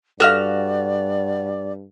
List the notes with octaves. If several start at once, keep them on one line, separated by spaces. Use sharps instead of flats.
G2 F#4 A4 D5 F5 F6